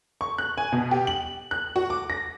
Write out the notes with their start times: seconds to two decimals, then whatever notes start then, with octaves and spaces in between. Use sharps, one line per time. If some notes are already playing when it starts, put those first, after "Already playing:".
0.21 C#6
0.38 F#6
0.58 G#5
0.72 B2
0.91 G4
1.07 F#7
1.51 F#6
1.76 F#4
1.90 D6
2.10 A#6